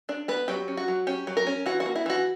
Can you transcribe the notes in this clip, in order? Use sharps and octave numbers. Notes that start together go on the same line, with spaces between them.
D4 D5
B3 B4
F#3 G4
C#4
F#4
F#3
C#4 G4
F#3
A#4
C#4
E3 F#4
F#4
A#3
E4
E3 F#4